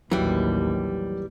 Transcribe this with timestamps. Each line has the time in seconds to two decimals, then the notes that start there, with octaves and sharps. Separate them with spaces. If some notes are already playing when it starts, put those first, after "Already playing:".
0.11 A1 D#2 E3 F#3 G3